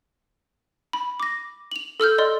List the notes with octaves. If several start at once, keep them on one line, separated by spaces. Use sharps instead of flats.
B5
D6 A#6
F7 F#7
A4 E6 F6 G6
D5 D#5 C6